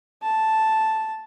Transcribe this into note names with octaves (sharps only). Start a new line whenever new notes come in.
A5